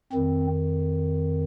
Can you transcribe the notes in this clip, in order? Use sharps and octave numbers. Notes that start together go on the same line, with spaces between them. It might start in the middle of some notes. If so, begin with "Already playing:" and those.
F2 D#3 C4